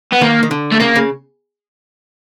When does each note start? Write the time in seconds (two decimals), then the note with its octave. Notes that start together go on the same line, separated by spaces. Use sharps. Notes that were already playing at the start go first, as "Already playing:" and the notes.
0.12 B3
0.21 D#3 A#3
0.43 D#3
0.51 D3
0.72 A3
0.80 C#3 A#3
0.96 C#3